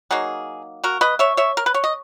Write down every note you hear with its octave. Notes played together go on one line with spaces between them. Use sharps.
F#3 A#3 D#4 G#4
F#4 A#4
B4 D#5
C#5 E5
C#5 E5
A#4
B4
C#5
D#5